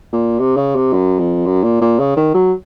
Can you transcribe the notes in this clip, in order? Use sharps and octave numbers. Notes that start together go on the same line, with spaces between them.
A#2
C3
C#3
C3
F#2
F2
F#2
A#2
A#2
C#3
D#3
F#3